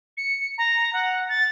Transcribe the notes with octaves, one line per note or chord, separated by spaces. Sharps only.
C#7
A#5
F#5
A6